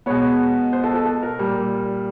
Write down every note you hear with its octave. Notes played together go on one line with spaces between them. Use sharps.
B2 G#3 B3 C#5
C5
A4
A4
A4
A#4
A#2 G3 A#3